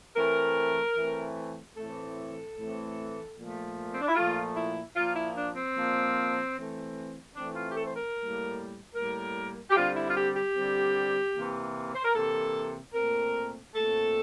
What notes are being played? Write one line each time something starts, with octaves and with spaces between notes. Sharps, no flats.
E3 A3 C4 A#4
E3 A3 C4
A2 E3 A3 C4 A4
A2 E3 A3 C4
A#2 F3 A3
C4
D4
E4
A#2 F3 A3 F4
E4
A#2 F3 A#3 F4
E4
D4
C4
A#2 F3 A#3
E3 A3 C4
E3 A3 C4 D4
F4
G4
A4
C5
A#4
A2 G3 A#3
A2 G3 A#3 A#4
G4
D3 G3 C4 F4
E4
F4
G4
G4
D3 G3 C4
C3 E3 A#3
C5
A#4
C3 E3 A#3 A4
A#2 A3 C4 A#4
A#2 A3 C4 A4